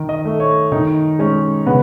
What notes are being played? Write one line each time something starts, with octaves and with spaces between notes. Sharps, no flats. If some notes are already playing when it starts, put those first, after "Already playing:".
Already playing: D#3
D#5
A3
C#5
D#3 D#4
G#3 C#4
C#3 B3